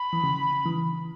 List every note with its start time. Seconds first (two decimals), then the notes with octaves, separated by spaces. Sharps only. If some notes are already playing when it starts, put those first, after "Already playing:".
Already playing: B5
0.13 E3
0.24 C#3
0.66 E3